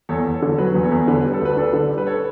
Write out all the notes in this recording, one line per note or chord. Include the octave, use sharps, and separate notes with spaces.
E2 A4 C#5
E2
A4 C#5
D3
F#3 B4
E2
A4 C#5
E2
D3 B4
G3 B4
A4
D2 B4
D4 A4
D3
G3
B4
A4 C#5